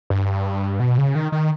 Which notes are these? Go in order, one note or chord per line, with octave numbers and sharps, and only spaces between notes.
G2
B2
C#3
D#3
D#3